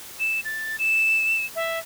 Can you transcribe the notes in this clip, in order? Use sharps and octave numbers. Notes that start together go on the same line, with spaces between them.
E7
A6
E7
E5